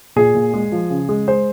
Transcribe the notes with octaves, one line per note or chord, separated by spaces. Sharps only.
A#2 G#4
A#2
G#3
F3
C#3
G#3
G#3 C5